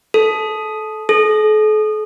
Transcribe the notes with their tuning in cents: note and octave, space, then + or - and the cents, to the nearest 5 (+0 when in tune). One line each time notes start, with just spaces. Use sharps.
A4 -20
A4 -45